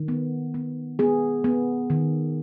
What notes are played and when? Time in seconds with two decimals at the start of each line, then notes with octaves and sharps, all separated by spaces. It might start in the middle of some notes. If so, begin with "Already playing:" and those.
Already playing: D#3
0.08 B3
0.54 B3
0.99 B3 G#4
1.44 B3
1.90 D#3